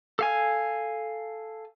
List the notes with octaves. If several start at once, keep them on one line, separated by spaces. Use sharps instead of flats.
A4 F5 G#5